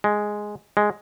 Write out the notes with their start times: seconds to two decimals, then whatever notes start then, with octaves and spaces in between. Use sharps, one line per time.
0.04 G#3
0.77 G#3